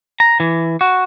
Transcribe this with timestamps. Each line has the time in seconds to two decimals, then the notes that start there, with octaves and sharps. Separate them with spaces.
0.20 A#5
0.40 E3
0.81 F#4